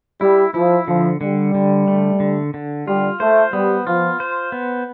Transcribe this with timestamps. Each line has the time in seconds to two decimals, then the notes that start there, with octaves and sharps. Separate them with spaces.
0.21 G3 E4
0.54 F3 E4
0.87 D3 F3
1.21 D3 G3
1.55 D3
1.88 A3
2.20 D3
2.54 D3
2.87 G3 F4
3.20 A3 C5
3.53 G3 B3
3.86 F3 F4
4.20 C5
4.52 B3